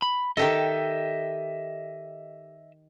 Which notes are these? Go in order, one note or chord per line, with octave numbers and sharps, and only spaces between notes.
B5
D#3 G4 A4 D#5 E5